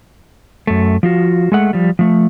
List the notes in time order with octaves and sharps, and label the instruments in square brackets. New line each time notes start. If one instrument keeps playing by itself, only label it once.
[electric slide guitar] F#2 A3
F3 F4 F#4
G#3 A3 F#5
F3 G3
F3 A3